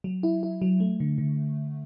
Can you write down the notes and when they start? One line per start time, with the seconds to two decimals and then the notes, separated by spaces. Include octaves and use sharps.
0.04 F#3
0.23 E4
0.43 E4
0.62 F#3
0.80 A3
1.00 D3
1.18 D3